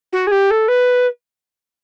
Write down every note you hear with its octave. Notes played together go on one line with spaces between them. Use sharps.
F#4
G#4
G4
A4
B4